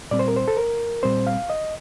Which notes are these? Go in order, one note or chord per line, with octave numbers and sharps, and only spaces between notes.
A#2 G3 C4 D5
C5
A#4
C5
A4
A#4
A#2 G3 C4 C5
F5
D#5